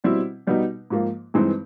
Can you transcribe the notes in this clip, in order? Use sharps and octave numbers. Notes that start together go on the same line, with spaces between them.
B2 G3 C4 E4
B2 G3 B3 D#4
G#2 F3 A#3
G2 E3 G#3 C4 D#4